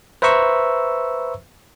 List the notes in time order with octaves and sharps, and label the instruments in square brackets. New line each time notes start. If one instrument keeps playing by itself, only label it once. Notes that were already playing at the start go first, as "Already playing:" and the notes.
[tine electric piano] B4 C5 E5 A#5 C#6 E6